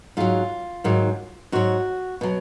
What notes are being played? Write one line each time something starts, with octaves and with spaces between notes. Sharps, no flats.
G#2 F#3 F4
G#2 D#3 F#3
G#2 F#3 F#4
B2 F#3